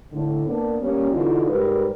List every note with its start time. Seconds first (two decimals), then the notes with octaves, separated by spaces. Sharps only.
0.12 A2 D3
0.46 A#3 B3 D4
0.81 G3 A#3 C#4
1.11 D3 E3 D#4 F4 F#4
1.49 G#2 G3 A#4 B4